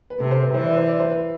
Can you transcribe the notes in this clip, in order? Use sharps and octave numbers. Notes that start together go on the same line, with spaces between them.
B4
C3 A4
C5
B4
E3 C5
D5
C5
D5
C5
B4